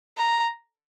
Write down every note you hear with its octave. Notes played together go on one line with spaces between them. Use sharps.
A#5